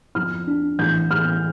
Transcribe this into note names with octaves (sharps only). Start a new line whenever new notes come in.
F2 F6
D4
A1 G6
A1 F6